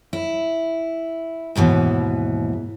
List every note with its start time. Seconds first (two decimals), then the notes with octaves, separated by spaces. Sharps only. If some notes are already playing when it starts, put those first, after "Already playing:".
0.13 E4
1.56 D#2 G#2 B2 E3